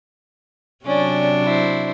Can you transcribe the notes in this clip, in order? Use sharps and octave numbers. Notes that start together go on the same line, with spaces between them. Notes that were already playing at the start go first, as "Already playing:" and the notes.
C3 F#3 C#4 D4 D5
E4 C5